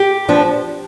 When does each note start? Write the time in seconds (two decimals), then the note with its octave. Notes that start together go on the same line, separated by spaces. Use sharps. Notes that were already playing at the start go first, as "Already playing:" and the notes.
Already playing: G4
0.29 F3 B3 D4